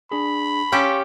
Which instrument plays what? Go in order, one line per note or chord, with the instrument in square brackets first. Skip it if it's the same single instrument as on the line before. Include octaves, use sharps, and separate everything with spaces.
[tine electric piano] D4 G#4 [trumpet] B5
[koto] C#4 G4 A4 [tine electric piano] F5 C6 C#6